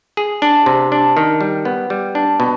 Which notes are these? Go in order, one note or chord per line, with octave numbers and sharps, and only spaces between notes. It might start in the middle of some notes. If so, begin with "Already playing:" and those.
G#4
D4
C3
D4
D#3
G3
B3
G3
D4
B2